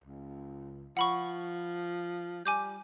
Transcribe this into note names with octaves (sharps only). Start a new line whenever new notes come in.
C#2
F3 F#5 B5 C#6
G3 G#5 D6 G6